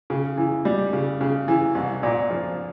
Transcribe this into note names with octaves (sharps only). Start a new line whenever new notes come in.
C#3
E3
G3
C#3
C#3
E3
C2
A#2
F3